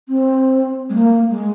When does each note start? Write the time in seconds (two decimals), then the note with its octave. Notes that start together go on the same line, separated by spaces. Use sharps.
0.09 C4
0.90 G#3
0.96 A#3
1.30 G#3